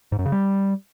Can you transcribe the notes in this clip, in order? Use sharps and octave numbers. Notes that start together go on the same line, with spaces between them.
G#2
F#2
C#3
G3